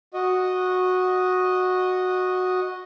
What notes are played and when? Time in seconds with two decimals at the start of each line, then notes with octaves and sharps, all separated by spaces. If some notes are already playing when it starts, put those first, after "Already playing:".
0.14 F#4 D#5